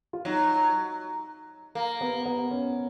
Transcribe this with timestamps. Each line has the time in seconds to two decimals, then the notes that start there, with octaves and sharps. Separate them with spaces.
0.13 F4
0.25 F#3 D#4
1.75 A#3
2.01 B3
2.26 B3
2.51 C#4